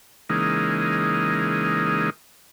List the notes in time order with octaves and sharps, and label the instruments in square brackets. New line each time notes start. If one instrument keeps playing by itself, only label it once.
[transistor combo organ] C#3 E3 G#3 A#3 D#4